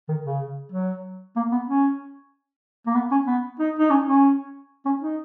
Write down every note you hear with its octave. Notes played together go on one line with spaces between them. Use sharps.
D#3
C#3
F#3
A#3
B3
C#4
A#3
B3
C#4
B3
D#4
D#4
C#4
C#4
C#4
D#4